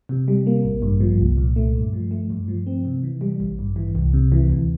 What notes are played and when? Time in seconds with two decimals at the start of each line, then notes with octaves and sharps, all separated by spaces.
0.09 C3
0.28 G3
0.47 A#3
0.64 A1
0.82 G2
1.00 F3
1.19 C2
1.37 A#2
1.56 A3
1.75 G2
1.93 F3
2.11 A3
2.30 G2
2.48 F3
2.67 C4
2.85 C3
3.03 E3
3.21 G3
3.40 A1
3.59 G2
3.76 E3
3.95 C2
4.13 C3
4.32 E3
4.50 D2